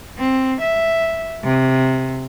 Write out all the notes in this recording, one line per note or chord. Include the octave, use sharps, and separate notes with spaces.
C4
E5
C3